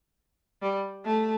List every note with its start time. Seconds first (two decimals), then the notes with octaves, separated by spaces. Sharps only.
0.62 G3
1.05 A3